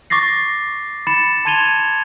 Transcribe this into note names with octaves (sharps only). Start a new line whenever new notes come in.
C#6 D6 A6 A#6 C7
B5 A6 C#7 E7
A5 C6 G#6 D#7 F7 G7